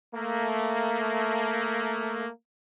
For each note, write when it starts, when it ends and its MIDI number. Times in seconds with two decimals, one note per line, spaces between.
0.14 2.27 57
0.14 2.27 58